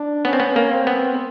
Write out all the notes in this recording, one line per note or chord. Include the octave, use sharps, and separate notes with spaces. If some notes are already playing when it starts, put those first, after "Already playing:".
Already playing: D4
B3 C#4
C4
B3
A#3
C4
B3